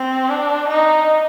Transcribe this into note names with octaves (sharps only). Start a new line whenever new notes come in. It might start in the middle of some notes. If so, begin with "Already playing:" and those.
Already playing: C4
D4
D#4